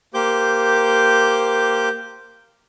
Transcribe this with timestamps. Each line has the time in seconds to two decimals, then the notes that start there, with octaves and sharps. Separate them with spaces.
0.14 A#3 G4 C5 D6 G6